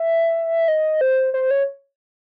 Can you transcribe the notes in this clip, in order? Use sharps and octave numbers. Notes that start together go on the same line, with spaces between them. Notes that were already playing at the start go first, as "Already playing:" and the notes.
Already playing: E5
D#5
C5
C5
C#5